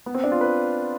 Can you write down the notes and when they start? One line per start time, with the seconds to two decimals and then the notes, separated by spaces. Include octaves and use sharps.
0.06 B3
0.14 C4
0.24 D4
0.32 F4
0.41 B4